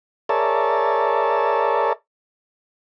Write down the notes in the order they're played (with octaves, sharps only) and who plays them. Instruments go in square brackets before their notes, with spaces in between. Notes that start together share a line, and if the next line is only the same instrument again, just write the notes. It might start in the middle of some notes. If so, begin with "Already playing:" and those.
[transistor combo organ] G#4 A#4 C#5 D5 E5 A5